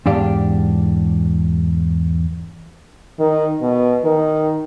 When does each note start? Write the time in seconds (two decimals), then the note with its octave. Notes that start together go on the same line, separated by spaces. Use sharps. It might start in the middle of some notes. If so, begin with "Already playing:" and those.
0.06 E2 G#2 D4 G4 F5
3.20 D#3
3.62 B2
4.04 D#3